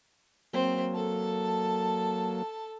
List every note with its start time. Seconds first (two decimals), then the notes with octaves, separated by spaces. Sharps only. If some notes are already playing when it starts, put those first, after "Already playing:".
0.53 F#3 A#3 C4 C5
0.94 A4 A5